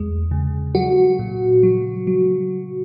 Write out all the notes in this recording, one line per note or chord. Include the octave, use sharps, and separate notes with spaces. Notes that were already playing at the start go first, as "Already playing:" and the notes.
Already playing: E2 G#3
C#3
F#3 F#4
A#2
F#3
F#3